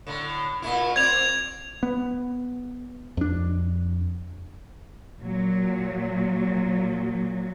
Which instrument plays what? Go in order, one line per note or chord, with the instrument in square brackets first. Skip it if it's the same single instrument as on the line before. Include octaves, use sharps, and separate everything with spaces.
[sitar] A2 D3
A#2 A3 E4
[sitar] C4 D5 [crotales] G#6 F7
[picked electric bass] B3
F2 D4
[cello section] A#2 F#3